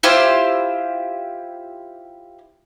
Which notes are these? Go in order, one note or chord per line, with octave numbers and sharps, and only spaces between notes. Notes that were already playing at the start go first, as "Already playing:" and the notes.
E4 F4 G4 C5